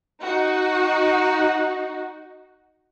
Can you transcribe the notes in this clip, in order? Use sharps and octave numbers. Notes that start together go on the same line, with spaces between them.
D#4 F#4